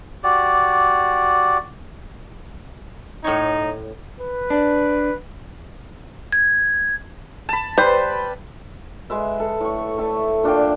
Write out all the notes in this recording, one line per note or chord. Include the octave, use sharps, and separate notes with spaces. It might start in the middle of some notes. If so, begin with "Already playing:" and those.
F#4 G4 D5
A2 D#4 C#5
B4
D4
G#6
A5 B5
G3 B4 C5 G5
G#3 B4 E5
A4
A2 C#6
A3 E5 A5
A#2 D4 F5 G5
E5